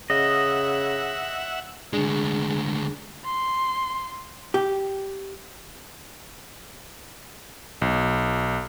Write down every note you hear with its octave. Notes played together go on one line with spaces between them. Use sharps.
C#3 D#5 E5 F#5
D2 G#3 D4 G#4
C6
G4
B1